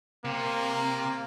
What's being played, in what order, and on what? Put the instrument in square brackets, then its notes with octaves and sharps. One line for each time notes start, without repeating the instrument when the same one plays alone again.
[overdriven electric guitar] C3 [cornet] A#3